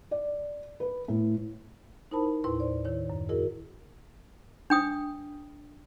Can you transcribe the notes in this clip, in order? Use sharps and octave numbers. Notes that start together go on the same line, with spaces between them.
D5
B4
A2
D#4 E4 A#4 C5 A5 B5
D#2 A2 E4 B4 C6
C5 D5
D#3 E4 C#5
F#2
E4 F#4 G#4 A#4 D#5
D4 G5 D#6